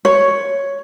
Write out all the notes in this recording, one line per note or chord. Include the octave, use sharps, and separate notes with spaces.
C#5